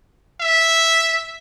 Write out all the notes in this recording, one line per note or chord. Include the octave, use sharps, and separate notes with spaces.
E5